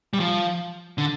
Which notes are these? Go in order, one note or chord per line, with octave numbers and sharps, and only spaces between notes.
G3
F3
D3